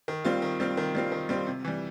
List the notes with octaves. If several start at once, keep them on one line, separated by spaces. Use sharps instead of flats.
D#3
G3 C4 F4
D#3
G3 C4 F4
D#3
G3 C4 F4
D#3
G3 C4 F4
C3
E3 G3